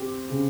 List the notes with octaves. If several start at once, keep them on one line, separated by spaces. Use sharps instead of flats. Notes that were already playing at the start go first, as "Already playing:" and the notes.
Already playing: C4 G4
C#3